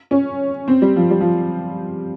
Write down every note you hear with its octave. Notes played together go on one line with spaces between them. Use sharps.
C#4
C4
G3
F3
G3
F3